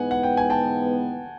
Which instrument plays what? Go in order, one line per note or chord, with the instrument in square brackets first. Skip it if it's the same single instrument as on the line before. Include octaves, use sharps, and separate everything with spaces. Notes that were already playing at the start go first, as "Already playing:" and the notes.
Already playing: [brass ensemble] G#2 E3 G#3 B3 [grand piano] F#5 G#5
[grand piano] F#5
G5
G#5
G5 A5